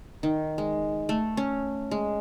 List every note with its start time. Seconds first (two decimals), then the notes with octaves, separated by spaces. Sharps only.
0.23 D#3
0.58 G#3
1.09 A3
1.37 C#4
1.91 G#3